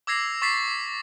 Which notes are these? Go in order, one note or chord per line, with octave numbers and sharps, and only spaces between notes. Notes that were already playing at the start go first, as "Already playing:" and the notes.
D6 E6 G#6 A#6 C7 F7
C#6 D6 A6 B6 C7
D6